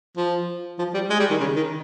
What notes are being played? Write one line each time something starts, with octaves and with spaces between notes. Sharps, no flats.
F3
F3
G3
G#3
G3
D#3
C#3
D#3